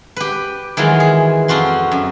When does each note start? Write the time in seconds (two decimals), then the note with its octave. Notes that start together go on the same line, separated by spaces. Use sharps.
0.16 G4 B4
0.77 D#3 E3 F#3 G#3 F4
1.00 G#4
1.48 F2 F4 F#4 C6
1.92 F#2